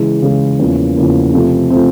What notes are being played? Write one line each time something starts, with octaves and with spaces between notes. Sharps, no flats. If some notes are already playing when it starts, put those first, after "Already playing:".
Already playing: C#3 E3 G#3
C#3 E3 G#3
E2 C#3 F3 A#3 C#4
E2 C#3 F3 A#3 C#4
C3 F3 A3 C4
C3 F3 A3 C4